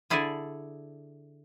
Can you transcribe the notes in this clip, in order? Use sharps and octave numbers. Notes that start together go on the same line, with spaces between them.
D3 E4 G#4 A4 D5 G#5